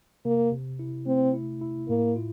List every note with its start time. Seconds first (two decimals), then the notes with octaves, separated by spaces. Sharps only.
0.25 C3 A#3
0.52 C3
0.79 E4
1.07 A3 C4
1.34 E4
1.61 E4
1.89 A2 A#3
2.16 F4